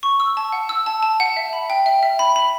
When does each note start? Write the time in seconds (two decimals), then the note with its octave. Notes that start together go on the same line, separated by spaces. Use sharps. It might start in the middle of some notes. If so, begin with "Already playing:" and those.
0.03 C#6
0.20 E6
0.37 A5
0.53 F#5
0.69 E6
0.86 A5
1.02 A5
1.20 F#5
1.37 E5
1.53 B5
1.70 G5
1.86 E5
2.03 E5
2.19 B5
2.36 B5